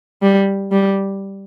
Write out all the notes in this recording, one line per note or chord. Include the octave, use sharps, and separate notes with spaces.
G3
G3